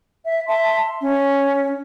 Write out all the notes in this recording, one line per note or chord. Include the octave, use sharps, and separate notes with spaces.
E5
E5 A5 C6
C#4